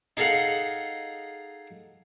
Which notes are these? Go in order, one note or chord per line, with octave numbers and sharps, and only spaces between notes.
D#4 G#4 A4 D#5 F5 F#5